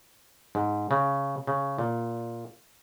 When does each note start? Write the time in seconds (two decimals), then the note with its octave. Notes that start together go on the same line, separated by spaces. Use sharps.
0.55 G#2
0.91 C#3
1.47 C#3
1.78 A#2